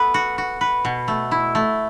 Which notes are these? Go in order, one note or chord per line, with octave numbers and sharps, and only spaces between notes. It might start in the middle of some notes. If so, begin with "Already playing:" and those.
Already playing: B3 A4 B4
F#4
F#4
B4
B2
A3
E4
A3